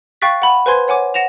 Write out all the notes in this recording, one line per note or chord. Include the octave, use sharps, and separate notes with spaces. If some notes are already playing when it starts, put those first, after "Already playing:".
F5 G5 C#6 F#6 A6 B6
F#5 B5
B4 C5 G#5 C6 G#6
C#5 F#5 G#5 D6
F#5 A#6 E7 F7